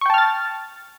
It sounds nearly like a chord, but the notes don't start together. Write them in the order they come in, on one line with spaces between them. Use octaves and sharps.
C#6 G5 A5 F6 A6